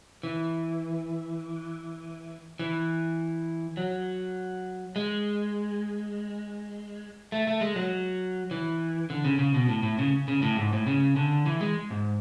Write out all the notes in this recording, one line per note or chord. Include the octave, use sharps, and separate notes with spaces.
E3
E3
F#3
G#3
A3
A3
G#3
F#3
E3
D3
C#3
C#3
B2
A2
A2
C#3
C#3
A2
G#2
A2
C#3
D3
E3
G#3
G#2